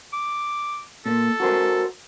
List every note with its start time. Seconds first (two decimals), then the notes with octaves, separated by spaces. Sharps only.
0.13 D6
1.06 A#2 A4
1.40 F#4 A#4 C5